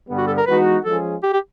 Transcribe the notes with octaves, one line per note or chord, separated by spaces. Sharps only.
G2 D3 G3 B3
F#4
A4
A#4
E3 G#3 B3 D#4 F#4 B4
F3 G#3 C#4 F4 G#4 A4
G4
G4